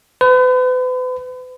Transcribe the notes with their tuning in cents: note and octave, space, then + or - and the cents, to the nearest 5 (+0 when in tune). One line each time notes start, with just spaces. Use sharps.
B4 +40